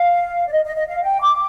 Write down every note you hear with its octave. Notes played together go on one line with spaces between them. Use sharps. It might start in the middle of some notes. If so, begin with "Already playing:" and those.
Already playing: F5
D5
D#5
D#5
D#5
F5
G5
D6